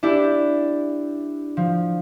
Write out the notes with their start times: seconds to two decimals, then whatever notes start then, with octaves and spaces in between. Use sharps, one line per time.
0.03 D4 E4 G4 D5
1.57 F3